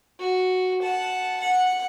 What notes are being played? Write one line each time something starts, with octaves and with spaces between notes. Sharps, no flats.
F#4
F#5 A5
F#5